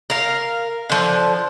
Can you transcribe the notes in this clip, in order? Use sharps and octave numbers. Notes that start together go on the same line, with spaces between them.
A#4 F5
D3 F3